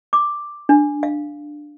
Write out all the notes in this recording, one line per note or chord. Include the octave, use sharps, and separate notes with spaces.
D6
D4
F5